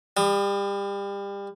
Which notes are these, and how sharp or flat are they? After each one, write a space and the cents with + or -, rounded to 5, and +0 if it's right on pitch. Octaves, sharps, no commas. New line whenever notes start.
G3 +30 D#6 -25